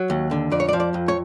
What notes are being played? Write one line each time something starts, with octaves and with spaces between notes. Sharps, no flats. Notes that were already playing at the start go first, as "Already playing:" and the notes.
Already playing: F#3
D#2
D3
F2 D5
C#5
D5
F3
D5
F2
C#5